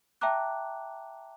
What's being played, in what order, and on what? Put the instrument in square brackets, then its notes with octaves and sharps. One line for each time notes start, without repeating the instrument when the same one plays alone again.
[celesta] E5 G5 A5 A#5 D6 F#6